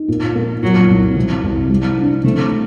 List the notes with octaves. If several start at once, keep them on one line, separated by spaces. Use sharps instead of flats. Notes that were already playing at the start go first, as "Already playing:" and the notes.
Already playing: D#4
A#2
A#3
A#2 F#3
C2
C3
C2
G3
D4
C3 A3